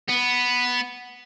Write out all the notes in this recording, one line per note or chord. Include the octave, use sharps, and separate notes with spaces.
B3